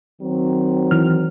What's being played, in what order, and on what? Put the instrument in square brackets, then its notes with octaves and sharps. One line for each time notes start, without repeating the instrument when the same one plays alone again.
[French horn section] D#3 F#3 C4
[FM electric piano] E3 F6